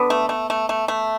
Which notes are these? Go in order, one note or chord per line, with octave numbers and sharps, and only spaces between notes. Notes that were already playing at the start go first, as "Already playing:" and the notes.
Already playing: D3 B3 B4
A3
A3
A3
A3
A3